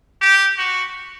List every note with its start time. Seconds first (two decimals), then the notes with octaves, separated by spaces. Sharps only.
0.21 G4
0.58 F#4